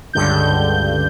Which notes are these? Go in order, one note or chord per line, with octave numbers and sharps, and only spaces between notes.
C#2 G2 D3 G6